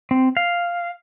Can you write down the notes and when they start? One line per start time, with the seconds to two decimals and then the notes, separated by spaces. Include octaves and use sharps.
0.11 C4
0.37 F5